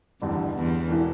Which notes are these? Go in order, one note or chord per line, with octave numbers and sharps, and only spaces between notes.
F1 E2 G2 D3 G3
E2
E1 E3